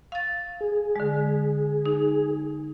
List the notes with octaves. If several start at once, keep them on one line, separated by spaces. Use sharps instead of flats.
F5 A6
G#4
D3 G#3
D#4